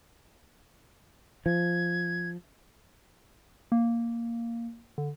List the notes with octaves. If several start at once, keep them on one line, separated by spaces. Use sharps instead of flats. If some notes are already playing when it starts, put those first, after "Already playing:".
F3 G#6
A#3
D3